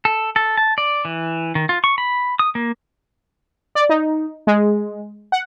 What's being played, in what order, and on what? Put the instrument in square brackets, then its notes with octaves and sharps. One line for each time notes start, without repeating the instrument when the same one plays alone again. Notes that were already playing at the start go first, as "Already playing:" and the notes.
[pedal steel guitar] A4
A4
A5
D5
E3
D#3
F4
C#6
B5
D#6
A#3
[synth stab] D5
D#4
G#3
F#5